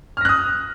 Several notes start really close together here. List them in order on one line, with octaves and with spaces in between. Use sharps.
F6 A#6 F#6 D#6